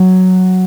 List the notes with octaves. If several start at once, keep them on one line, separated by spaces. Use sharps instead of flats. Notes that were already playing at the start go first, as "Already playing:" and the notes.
Already playing: F#3